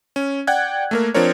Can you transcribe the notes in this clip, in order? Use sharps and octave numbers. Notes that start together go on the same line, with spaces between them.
C#4
D5 F#5 G5 F#6 G#6
A3 A#3 A#4
F3 C4 D4 A#4 C#5